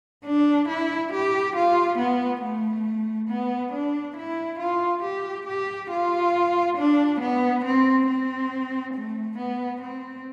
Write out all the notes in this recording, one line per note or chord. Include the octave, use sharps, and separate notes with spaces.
D4
E4
G4
F4
B3
A3
B3
D4
E4
F4
G4
G4
F4
D4
B3
C4
C4
A3
B3
C4